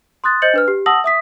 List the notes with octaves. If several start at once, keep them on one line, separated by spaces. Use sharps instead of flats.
C6 D#6 F#6 A6
C5 D#5 G6 A6 C#7 F#7
D4 B4 F6
G4
F#5 A5 D#6 E6 A#6 F#7
E5 D#6 B6